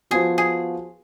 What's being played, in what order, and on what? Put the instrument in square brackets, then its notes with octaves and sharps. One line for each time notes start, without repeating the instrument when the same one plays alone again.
[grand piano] F3 B3 F#4 [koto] G#4
[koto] G#4